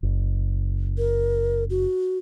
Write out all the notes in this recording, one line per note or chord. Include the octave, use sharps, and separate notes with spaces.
F#1
A#4
F#4